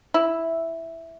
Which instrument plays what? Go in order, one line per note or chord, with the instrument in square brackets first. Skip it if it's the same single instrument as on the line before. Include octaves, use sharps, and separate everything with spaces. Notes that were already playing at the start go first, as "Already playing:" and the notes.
[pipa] E4